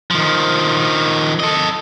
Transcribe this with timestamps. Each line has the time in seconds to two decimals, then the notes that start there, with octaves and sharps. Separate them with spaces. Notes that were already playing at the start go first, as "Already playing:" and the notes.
0.11 D#3 F3
1.40 A4 D#5